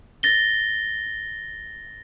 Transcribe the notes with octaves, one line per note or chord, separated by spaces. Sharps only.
A6 A#6 G7